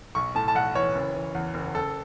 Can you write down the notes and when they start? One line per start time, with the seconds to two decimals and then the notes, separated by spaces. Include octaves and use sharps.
0.15 B1 C#6
0.35 A2 A5
0.48 A5
0.55 B1 F#5
0.75 E3 C#5
0.95 F#1
1.15 E3
1.35 E2
1.54 F#1
1.74 F#1 A4